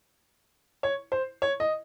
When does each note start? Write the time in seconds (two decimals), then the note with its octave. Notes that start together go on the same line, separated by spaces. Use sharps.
0.83 C#5
1.12 C5
1.42 C#5
1.60 D#5